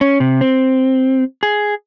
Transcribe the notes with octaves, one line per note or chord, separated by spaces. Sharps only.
C#4
C3
C4
G#4